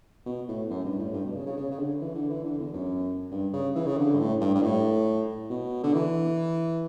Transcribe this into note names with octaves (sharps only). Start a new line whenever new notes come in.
B2
A2
F#2
G2
A2
G2
B2
C#3
C#3
C#3
C#3
D3
E3
D3
E3
D3
E2
F#2
G2
C#3
E3
C#3
D3
G2
A2
G2
G2
A2
B2
D3
E3